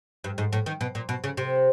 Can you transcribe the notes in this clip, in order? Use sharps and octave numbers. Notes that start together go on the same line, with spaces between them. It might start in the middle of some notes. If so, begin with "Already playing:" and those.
G2
G#2
A2
D#3
B2
A#2
B2
C#3
C3